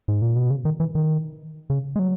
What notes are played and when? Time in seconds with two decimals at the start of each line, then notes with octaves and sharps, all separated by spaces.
0.08 G#2
0.22 A#2
0.36 B2
0.50 C#3
0.65 D#3
0.80 E3
0.95 D#3
1.70 C#3
1.96 G#3
1.99 F#3